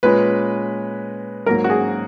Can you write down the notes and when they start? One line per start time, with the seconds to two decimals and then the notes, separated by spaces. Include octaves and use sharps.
0.03 A#2 G#3 C#4 B4
1.46 G#2 F#3 A#3 A#4
1.64 F#4
1.70 G#4